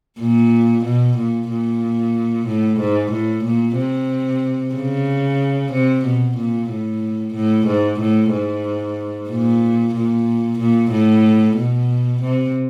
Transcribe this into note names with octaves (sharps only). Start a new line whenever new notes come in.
A#2
B2
A#2
A#2
A2
G#2
A2
A#2
C3
C#3
C3
B2
A#2
A2
A2
G#2
A2
G#2
A#2
A#2
A#2
A2
B2
C3